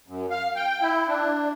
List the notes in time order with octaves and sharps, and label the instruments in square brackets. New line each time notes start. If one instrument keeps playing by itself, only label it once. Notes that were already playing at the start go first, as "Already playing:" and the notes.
[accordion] F#2
F5
G5
E4
D4